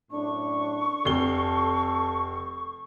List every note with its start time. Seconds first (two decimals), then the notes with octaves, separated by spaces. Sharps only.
0.11 F#2 A2 D4 C#6
1.05 F1 A4 G7